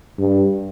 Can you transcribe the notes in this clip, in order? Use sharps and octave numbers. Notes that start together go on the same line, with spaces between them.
G2